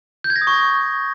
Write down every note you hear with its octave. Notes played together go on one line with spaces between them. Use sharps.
G6
G#6
A#6
D#6
C#6